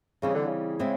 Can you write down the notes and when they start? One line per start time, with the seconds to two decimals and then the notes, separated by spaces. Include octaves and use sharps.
0.22 C#3 E3 G3 C4 D#4
0.35 D3
0.46 C#3
0.79 G#3 C4 E4